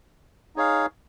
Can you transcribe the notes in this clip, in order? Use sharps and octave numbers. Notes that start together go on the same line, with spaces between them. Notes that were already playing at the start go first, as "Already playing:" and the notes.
D#4 G#4 C#5 F5